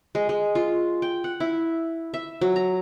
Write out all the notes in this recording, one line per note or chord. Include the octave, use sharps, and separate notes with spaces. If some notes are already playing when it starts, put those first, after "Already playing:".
G#3
G#3
F4
G5
F#5
E4
E5
F#3
A#5